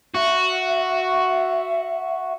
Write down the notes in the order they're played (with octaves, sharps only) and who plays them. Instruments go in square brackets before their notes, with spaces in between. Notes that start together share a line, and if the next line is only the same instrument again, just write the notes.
[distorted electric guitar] F#4 [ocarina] E5